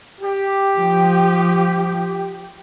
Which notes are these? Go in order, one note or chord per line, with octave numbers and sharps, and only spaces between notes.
G4
F3